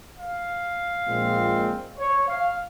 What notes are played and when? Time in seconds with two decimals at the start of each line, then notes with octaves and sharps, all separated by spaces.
0.15 F5
1.06 A#1 A#2 G#3 C4 F4
1.98 C#5
2.28 F5